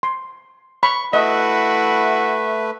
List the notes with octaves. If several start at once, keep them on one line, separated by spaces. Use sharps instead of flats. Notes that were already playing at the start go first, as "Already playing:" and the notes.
C6
B5 C#6
A3 E4 F#4 B4 D#5 E5